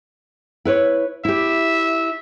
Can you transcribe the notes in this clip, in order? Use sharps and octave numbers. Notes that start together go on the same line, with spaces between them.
E4 B4 C#5
E4 G4 E5